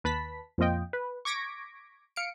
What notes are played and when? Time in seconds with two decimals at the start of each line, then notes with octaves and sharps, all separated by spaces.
0.04 D#2 B4 A5 B5 B6
0.58 F2 A#2 F3 F4 D#5 G5
0.93 B4
1.25 C#6 D6 G#6 A#6 B6 D7
2.16 F5 C#7 D7